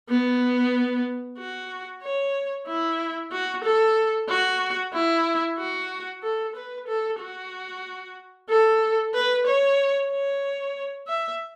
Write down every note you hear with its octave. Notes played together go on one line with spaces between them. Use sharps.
B3
F#4
C#5
E4
F#4
A4
F#4
E4
F#4
A4
B4
A4
F#4
A4
B4
C#5
C#5
E5